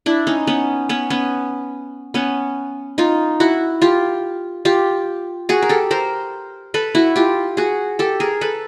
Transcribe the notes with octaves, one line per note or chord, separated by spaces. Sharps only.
D4 E4
C#4 D#4
B3 C#4
B3 C#4
B3 C#4
B3 C#4
D#4 F4
E4 F#4
F4 G4
F4 G4
F#4 G#4
A#4
G4 A4
A#4 C5
A4 B4
E4 F#4
F4 G4
F#4 G#4
G4 A4
G#4 A#4
A4 B4